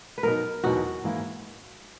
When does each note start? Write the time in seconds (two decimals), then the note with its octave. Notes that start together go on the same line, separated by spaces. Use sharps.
0.18 B4
0.23 B2 F#3 B3 D#4 A#4
0.64 E2 B2 F#3 B3 D#4 F#4
1.04 G#2 E3 A#3 E4